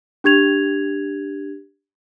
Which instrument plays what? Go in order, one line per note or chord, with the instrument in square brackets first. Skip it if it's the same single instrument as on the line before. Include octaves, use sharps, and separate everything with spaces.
[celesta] D4 G4 G#6 F7